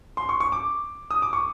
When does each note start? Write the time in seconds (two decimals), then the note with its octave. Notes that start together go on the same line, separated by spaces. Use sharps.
0.17 C6
0.29 C#6
0.40 C#6
0.52 D6
1.11 D#6
1.22 D6
1.33 C#6